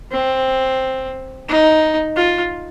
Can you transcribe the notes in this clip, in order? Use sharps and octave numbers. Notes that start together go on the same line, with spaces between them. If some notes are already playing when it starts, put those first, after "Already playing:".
C4
D#4
F4